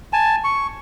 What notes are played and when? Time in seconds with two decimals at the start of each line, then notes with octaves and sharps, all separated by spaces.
0.13 G#5 A5
0.44 C#6